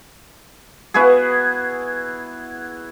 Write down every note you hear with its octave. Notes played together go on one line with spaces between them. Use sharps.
B3 E4 F#4 G#4